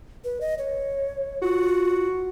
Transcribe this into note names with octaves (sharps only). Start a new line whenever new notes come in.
B4
D#5
C#5
F4 F#4